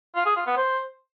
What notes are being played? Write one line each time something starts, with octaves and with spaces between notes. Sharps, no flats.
F4
G#4
F4
B3
C5